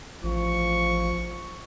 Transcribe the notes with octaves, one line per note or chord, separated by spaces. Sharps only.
A1 F3 C#6